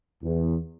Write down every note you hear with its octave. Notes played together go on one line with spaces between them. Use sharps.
E2